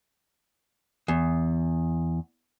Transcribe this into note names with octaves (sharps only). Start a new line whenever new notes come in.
E2